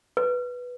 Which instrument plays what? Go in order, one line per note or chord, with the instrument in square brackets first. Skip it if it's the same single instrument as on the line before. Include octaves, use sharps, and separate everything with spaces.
[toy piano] B4